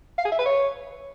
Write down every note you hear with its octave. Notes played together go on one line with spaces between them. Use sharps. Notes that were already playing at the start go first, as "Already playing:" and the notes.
F5
G#4
E5
B4
C#5